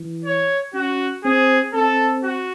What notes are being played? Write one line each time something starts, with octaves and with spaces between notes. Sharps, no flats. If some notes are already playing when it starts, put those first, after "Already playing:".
Already playing: E3
C#5
C#4 F#4
C4 G#4
C4 A4
F#4